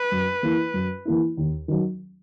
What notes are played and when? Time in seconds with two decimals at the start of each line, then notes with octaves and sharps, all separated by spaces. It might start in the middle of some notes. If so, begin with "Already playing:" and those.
Already playing: B4
0.12 F#2
0.43 E3 A#3 E4
0.74 F#2
1.05 E3 A#3 E4
1.37 D#2
1.68 D#3 F#3